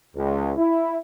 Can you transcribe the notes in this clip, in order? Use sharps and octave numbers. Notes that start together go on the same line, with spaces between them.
C#2
E4